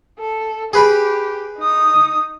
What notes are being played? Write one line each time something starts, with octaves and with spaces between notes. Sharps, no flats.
A4
G4 G#4 B4 B5
D#4 D#6